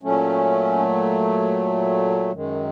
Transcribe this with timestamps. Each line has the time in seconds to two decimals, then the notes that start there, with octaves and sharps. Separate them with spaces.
0.03 A#2 F#3 A3 C#4
2.32 F#2 D#3 G#3